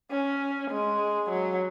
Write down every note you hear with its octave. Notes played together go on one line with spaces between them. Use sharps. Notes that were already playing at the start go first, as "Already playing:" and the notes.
C#4
G#3
F#3